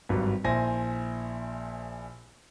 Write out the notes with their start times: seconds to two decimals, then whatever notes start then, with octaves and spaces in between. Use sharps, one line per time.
0.09 G#1 G2 F#3
0.44 A#1 E4 C5 G#5 A#6